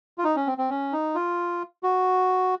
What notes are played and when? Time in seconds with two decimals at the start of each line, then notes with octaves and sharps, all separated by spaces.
0.18 F4
0.24 D#4
0.36 C#4
0.47 C4
0.58 C4
0.70 C#4
0.92 D#4
1.15 F4
1.83 F#4